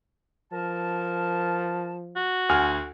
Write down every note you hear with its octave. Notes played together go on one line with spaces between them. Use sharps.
F3 A#4 A5
F#4
D2 G#5 F6